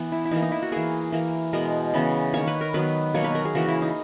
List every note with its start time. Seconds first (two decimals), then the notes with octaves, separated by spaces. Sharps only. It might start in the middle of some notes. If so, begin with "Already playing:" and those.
Already playing: E3 B3
0.12 E4
0.25 E4
0.31 E3 A#3 D#4
0.42 D#4
0.52 E4
0.62 F#4
0.72 E3 A#3 G#4
1.12 E3 A#3
1.53 B2 G#3 B3 A#4
1.94 C#3 E3 B3
2.34 D#3 A#3 C#5
2.47 B4
2.61 A#4
2.74 D#3 F#3 B3 B4
3.14 B2 F#3 A#3 C#5
3.24 B4
3.35 A#4
3.45 G#4
3.55 C#3 E3 A#3 F#4
3.68 E4
3.82 D#4